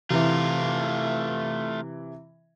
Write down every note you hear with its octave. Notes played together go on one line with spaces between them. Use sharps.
C3 E3 A3 F4